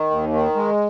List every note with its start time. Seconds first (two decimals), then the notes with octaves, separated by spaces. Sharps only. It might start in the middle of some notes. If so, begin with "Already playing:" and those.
Already playing: D#3
0.11 D#2
0.33 D#3
0.55 G#3